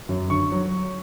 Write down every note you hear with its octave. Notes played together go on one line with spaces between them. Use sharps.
F#2
D3 C#6
F#3